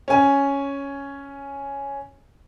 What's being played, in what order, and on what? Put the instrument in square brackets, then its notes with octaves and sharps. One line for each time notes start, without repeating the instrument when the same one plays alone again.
[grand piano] C#4 G#5